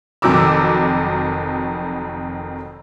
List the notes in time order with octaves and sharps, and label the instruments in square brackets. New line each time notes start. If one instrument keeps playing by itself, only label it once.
[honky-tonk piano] F1 F2 D#3 F#3 D6 E6